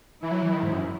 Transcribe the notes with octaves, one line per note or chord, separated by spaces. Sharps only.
E3 E4
F#3
E3
D#3
G#2
F#2